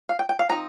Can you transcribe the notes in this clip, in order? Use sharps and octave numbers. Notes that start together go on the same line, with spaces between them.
F5
G5
G5
F5
F3 C4 D#4 A#5